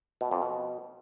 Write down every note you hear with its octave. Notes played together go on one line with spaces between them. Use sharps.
B2
F2
B2